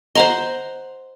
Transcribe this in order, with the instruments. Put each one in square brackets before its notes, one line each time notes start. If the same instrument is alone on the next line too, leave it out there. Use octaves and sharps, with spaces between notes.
[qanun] C5 F#5 C6 [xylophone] D#5 A#5